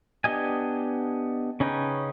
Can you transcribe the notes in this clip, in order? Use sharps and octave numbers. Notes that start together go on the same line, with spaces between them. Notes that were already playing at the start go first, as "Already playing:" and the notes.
B3 D4 G4 D#5 G#5
C#3 C#4 D#4 B4 G5